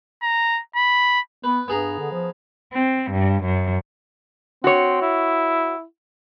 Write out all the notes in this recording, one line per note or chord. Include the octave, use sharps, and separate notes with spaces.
A#5
B5
B3 B4
G2 B3 G#4 A#5
D3
F3
C4
G2
F#2
C4 F#4 C#5
E4